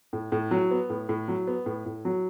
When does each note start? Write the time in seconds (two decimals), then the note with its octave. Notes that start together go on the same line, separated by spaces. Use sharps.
0.13 A2
0.32 A2
0.51 F#3
0.71 B3
0.90 A2
1.09 A2
1.28 F#3
1.47 B3
1.66 A2
1.86 A2
2.05 F#3